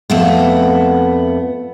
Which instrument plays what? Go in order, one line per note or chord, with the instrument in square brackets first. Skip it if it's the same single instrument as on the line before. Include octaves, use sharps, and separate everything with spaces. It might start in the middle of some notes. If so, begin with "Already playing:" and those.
[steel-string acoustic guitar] F2 A3 B3